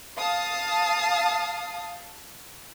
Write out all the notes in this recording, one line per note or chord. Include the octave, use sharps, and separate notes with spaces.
F5 A5 D#6